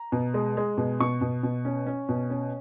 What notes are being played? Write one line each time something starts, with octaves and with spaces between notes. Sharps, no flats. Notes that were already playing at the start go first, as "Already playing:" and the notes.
Already playing: A#5
B2
G#3
G#3
B2
B2 C#6
B2
B2
C#4
C#4
B2
C#4